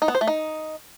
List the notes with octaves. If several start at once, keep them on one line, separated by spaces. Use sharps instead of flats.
D#4
B3
C5
A3
D#4